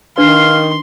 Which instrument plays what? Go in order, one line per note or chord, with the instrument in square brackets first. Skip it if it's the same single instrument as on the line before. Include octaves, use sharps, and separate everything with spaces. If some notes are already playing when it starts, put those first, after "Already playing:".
[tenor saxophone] D#3 [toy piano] D4 B4 [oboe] F5 [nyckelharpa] C6